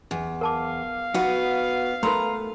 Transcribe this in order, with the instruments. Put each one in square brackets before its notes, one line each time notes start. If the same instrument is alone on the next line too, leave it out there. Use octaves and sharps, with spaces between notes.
[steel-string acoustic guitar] E2
[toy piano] A#4 A5 D6 [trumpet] F5
[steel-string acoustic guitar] B3 B4 [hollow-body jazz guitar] D#4 F#4
[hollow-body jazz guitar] A3 B4 [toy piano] D#4 A#4 C6 [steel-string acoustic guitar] A#5